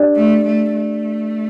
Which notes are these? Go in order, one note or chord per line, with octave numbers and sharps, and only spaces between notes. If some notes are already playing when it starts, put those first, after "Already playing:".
Already playing: D4 G4 D5
A3
A3
A3